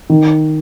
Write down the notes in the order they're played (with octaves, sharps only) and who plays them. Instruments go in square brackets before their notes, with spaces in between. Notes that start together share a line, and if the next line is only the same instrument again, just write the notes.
[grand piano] D#3